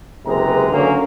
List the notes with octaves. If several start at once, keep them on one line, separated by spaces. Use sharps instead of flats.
F#1 C3 G#3 B4 A#5
D3 F#3 A#3 C#4